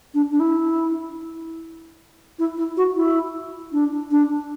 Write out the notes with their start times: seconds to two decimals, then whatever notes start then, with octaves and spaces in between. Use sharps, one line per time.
0.14 D4
0.32 D4
0.40 E4
2.39 E4
2.57 E4
2.77 F#4
2.96 E4
3.73 D4
4.11 D4